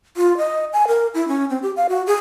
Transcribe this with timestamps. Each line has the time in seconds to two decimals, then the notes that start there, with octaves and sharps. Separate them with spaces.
0.17 F4
0.38 D#5
0.73 G#5
0.88 A#4
1.14 E4
1.28 C#4
1.50 C4
1.62 G4
1.77 F5
1.89 F#4
2.07 G#4